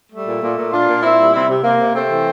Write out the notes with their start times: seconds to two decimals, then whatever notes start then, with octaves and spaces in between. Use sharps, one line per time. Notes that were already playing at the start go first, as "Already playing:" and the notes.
0.12 G3 A3
0.27 A#2
0.42 A#2
0.57 A#2
0.73 A#2 D4 F4
0.88 A#2
1.03 A#2 C4 E4
1.19 G3
1.33 C3 C4 E4
1.49 C3
1.64 C3 A#3
1.80 C3
1.94 C3 A3 C4
2.10 E3